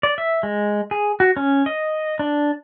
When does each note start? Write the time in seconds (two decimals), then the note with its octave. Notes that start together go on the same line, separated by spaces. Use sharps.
0.03 D5
0.18 E5
0.43 G#3
0.91 G#4
1.20 F#4
1.37 C#4
1.66 D#5
2.19 D4